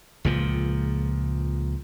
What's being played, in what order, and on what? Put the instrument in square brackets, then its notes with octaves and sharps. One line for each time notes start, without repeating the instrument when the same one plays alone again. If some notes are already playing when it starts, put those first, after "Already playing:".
[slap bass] C#2 A#2 F3